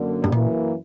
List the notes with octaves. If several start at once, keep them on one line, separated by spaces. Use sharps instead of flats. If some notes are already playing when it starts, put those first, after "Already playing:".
Already playing: F#2 D3 A#3
G2
F#2 A#2 E3 A#3